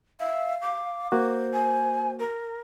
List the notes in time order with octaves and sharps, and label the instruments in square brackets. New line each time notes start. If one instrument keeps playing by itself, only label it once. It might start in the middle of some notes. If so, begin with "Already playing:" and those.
[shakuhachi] E5 [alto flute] F5
[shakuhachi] D6
[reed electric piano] A#3 F#4 [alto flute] C5
[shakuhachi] G#5
A#4